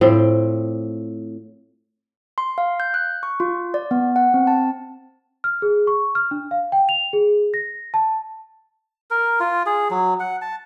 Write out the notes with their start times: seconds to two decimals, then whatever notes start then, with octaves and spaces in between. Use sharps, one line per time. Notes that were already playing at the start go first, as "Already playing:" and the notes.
0.01 A2 F3 C4 G5
2.38 C6
2.58 F5
2.80 G6
2.94 F#6
3.23 C#6
3.40 F4
3.74 D5
3.91 B3
4.16 F#5
4.34 C4
4.47 A5
5.44 F6
5.62 G#4
5.87 C#6
6.15 F6
6.31 D4
6.51 F5
6.72 G5
6.89 F7
7.13 G#4
7.54 A#6
7.94 A5
9.10 A#4
9.40 F4
9.66 G#4
9.91 F#3
10.20 F#5
10.42 A5